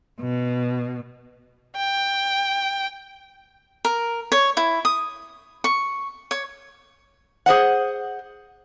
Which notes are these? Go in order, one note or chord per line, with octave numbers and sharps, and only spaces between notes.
B2
G5
A#4
C#5
E4
D#6
C#6
C#5
G#4 C5 D#5 F#5